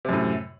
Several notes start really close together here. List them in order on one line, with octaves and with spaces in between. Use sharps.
C3 F#2 A2